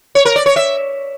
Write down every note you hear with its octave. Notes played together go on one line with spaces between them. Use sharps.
C#5
A#4
D5
C#5
E5